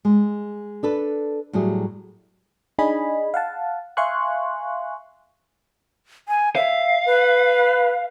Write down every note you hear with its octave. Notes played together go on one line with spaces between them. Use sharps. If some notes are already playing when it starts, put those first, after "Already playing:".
G#3
D4 A4 B4
A2 F#3 G3 G#4
D4 D#4 G#4 D#5 G#5 B5
F5 F#5 A5
E5 F5 G#5 C6 C#6 F#6
G#5
E5 F5
B4